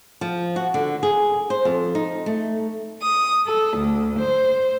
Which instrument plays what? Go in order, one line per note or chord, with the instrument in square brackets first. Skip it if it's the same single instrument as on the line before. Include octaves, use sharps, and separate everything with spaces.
[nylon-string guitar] F3
F#4
D3
G#4
C5
F2
D#4
A3
[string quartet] D#6
A4
D2
C5